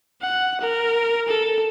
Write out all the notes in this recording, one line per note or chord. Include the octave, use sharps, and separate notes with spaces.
F#5
A#4
A4